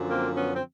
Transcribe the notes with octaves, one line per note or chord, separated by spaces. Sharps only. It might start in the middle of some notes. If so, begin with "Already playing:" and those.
Already playing: F#2 D3 F3
A#3 C4
B3 C#4
C4